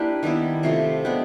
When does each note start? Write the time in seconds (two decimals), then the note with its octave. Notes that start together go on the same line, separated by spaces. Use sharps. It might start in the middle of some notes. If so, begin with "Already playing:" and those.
Already playing: A#3 D4 E4 G4 B4
0.23 D#3 G3 B3 E4
0.63 C3 F3 A3
1.05 G#3 B3 D4 G4